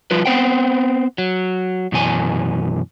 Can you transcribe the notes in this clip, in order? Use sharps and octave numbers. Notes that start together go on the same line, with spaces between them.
F3 G3 F4 B4
B3 C4 C5 F#5 G5
F#3
F#2 B2 E3 G#5